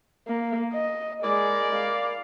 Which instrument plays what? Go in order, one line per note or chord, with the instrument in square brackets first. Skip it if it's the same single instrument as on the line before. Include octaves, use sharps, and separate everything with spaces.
[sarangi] A#3
D#5
[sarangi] G#3 [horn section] E4 A#4 D5
[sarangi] F5